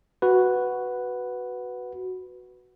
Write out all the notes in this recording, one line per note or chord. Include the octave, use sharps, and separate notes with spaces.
F#4 B4